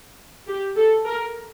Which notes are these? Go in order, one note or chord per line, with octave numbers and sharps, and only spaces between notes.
G4
A4
A#4